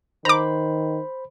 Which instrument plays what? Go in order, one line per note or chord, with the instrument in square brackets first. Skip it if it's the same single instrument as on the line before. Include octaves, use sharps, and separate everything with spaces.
[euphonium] D#3 [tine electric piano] C5 B5 [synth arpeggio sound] A#5 D6